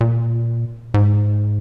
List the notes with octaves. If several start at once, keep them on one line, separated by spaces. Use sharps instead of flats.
A#2
G#2